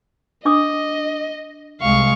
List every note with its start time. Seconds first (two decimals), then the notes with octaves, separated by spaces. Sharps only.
0.45 D4 D#5 D6 D#6
1.81 C2 G#3 F5 C#6